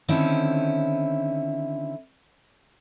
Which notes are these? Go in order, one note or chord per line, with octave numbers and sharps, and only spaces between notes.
D3 D#3 C4 C#4 E4